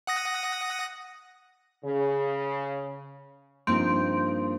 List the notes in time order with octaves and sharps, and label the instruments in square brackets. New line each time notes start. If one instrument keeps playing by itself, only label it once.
[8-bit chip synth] F#5 D#6 A#6
[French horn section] C#3
[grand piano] G2 F3 D#4 [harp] A#3 C4 [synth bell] C6 G6 D7